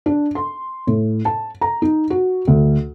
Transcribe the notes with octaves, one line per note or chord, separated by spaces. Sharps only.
D4
C6
A2
A5
A#5
D#4
F#4
D2